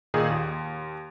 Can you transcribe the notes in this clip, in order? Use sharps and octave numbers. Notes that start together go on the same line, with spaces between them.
A#2 D#3 D#4 G#4
D#2